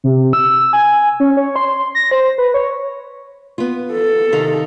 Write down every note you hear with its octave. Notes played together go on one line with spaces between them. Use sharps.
C3
E6
G#5
C#4
C#5
C6
A#6
C5
B4
C#5
B3 F4
A4
C3 D#3 F5